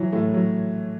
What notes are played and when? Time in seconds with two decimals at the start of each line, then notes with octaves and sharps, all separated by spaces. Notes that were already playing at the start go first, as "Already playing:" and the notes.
Already playing: E3 F#3
0.12 A2 A3
0.34 F#3